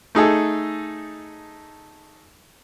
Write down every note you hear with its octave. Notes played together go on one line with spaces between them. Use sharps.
A3 D#4 G#4 A4